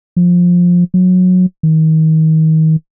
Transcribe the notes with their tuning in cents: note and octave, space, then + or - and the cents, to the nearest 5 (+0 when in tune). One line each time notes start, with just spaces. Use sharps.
F3 +15
F#3 -20
D#3 +30